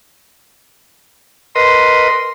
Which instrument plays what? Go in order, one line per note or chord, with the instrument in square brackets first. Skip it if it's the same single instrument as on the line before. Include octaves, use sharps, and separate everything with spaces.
[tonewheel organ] A#4 B4 D#5 [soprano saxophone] C6